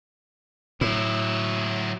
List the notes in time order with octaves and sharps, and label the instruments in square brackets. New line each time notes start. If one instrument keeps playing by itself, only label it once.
[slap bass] A2 [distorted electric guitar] F#3 E4